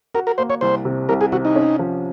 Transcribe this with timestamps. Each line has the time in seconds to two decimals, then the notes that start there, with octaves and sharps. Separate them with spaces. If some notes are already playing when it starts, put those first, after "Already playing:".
0.15 F#4 A#4
0.27 A#4
0.38 A#3 C5
0.50 C#5
0.61 C2 C5
0.85 C3
1.09 C2 A#4
1.21 G#4
1.32 C3 F#4
1.45 D#4
1.55 C#4
1.79 F3